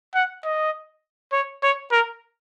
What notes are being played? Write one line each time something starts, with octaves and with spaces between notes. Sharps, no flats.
F#5
D#5
C#5
C#5
A#4